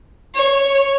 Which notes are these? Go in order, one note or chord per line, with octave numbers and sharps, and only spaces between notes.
C#5